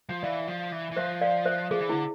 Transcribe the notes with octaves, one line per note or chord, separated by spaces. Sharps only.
F3
E3 D5 F5
F3
E3
E3
F3 C5 E5
D5 F5
C5 E5
F3 G#4
E3
D3 E4